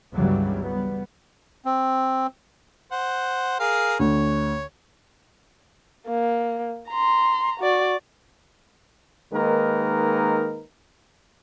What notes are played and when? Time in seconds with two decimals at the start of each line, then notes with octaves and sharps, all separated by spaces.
0.13 G1 C#2 C#3 E3 F#3 G3
0.65 G3 B3
1.65 C4
2.91 C5 F#5
3.60 G#4 A#4 F5
3.99 D2 C#5
6.07 A#3
6.89 A#5 C6
7.60 F#4 D5
9.33 D#3 G#3 A#3 D#4 A#4 B4